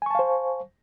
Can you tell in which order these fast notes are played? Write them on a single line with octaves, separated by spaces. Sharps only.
G#5 C#6 A5 F5 C5